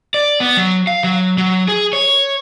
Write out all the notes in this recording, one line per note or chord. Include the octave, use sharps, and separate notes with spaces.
D5
B3
F#3
F5
F#3
F#3
G#4
C#5